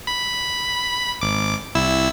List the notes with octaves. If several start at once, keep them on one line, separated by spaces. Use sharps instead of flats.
B5
G#1 D6
C2 E4 E6